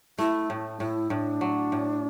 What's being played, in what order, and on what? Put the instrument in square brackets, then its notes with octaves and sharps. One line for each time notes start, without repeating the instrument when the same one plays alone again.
[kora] A3 [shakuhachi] E4
[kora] A2
[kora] A2 [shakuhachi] E4
[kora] A2 [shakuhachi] D4
[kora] F#3
A2